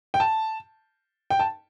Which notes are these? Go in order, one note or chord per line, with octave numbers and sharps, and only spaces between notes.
G5
A5
G5
A5